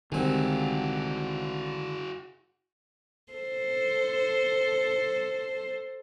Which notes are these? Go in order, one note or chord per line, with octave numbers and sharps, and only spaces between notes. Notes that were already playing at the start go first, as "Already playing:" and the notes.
C2 D3 D#3 G#3 C4 F#4 G#4
A4 C5